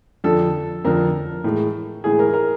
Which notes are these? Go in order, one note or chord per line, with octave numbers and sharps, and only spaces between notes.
F2 D3 F3 A4
F2 D3 F3 A#4
A2 E3 G#3
A2 E3 G#3 G#4
A#4
A#4